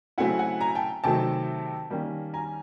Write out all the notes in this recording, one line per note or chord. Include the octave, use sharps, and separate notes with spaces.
C#3 F#3 A3 C4 E4 F#5 G#5
F#5 G#5
G#5 A#5
G5 A5
C3 D#3 F#3 A3 C4 G5 A5
D#3 G3 A#3 C#4
G#5 A#5